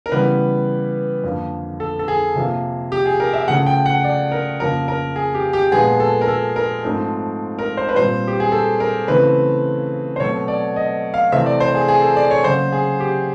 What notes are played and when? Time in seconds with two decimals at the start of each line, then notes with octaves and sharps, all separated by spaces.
0.06 A#4
0.12 C#3 E3 G3 B3 B4
1.24 F2 D3 F3 A#3
1.80 A4
1.99 A4
2.08 G#4
2.36 C3 F3 A#3
2.92 G4
3.06 G#4
3.20 A#4
3.33 E5
3.48 C#3 F3 A3 F#5
3.66 G5
3.86 F#5
4.04 D5
4.32 A#4
4.60 F2 C#3 F3 A#3 A#4
4.88 A#4
5.16 G#4
5.34 G4
5.53 G4
5.71 A#2 F3 G#3 B3 G#4
6.00 A4
6.21 A#4
6.28 A4
6.56 A#4
6.84 G#2 F3 A3 C4
7.59 A#4
7.77 C5
7.89 B4
7.96 A#2 G3 C4 C5
8.28 G4
8.40 G#4
8.52 A4
8.80 A#4
9.08 C#3 E3 A3 C4 B4
10.16 C5
10.20 B2 F#3 A3 C4 C#5
10.48 D5
10.76 D#5
11.14 F5
11.32 C3 E3 A3 C4 E5
11.46 D5
11.60 C5
11.74 G#4
11.88 G#4
12.02 A4
12.16 D5
12.30 C#5
12.44 C#3 F#3 A#3 C5
12.72 G#4
13.00 G4